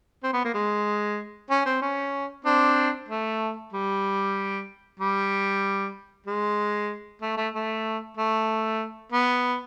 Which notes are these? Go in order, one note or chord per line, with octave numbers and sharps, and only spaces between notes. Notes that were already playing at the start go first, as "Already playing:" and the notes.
C4
B3
A#3
G#3
C#4
C4
C#4
C4 D4
A3
G3
G3
G#3
A3
A3
A3
A3
B3